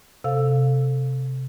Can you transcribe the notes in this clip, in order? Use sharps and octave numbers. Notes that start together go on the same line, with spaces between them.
C3 A4 F5